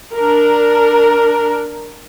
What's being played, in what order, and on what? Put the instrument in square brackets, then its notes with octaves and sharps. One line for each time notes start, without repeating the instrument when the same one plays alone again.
[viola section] D4 A#4